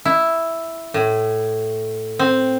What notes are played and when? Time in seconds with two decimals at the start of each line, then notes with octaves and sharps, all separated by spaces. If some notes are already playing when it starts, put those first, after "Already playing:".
0.05 E4
0.94 A2
2.19 C4